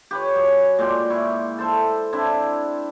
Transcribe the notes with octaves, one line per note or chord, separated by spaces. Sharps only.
G4 B4 C#5
F#3 G#4
A#2 G#3 D5 G5
E4 C#6
A4 C5 E5
C4 D4 E4